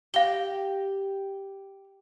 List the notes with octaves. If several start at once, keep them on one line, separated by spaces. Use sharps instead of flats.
G4 F5 G7